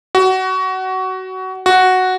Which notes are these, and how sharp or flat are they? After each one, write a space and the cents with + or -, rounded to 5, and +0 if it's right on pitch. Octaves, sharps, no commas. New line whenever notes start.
F#4 +20
F#4 +0